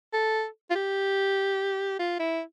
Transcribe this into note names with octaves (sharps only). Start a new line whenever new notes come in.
A4
F4
G4
F4
E4